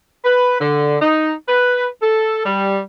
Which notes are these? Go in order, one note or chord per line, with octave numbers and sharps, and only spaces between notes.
B4
D3
D#4
B4
A4
G3